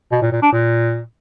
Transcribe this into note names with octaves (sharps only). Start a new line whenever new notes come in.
B2
A#2
A#2
D4
A#2